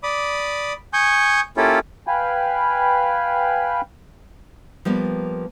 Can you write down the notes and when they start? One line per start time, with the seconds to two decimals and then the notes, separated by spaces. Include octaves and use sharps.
0.03 D5 B5 D6 D#6
0.93 G#5 C#6 D#6 G6
1.57 A#3 C#4 E4 F4 G4 A4
2.07 B4 F5 G5 G#5 B5
4.85 F3 G3 A#3 B3